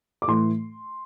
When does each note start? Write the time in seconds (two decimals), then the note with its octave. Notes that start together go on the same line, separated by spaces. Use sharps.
0.22 D6
0.27 A2 E3 A3 C6